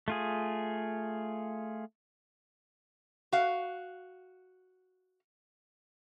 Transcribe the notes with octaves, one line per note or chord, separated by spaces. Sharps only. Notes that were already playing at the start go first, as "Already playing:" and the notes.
A3 F4 G#4
F#4 F5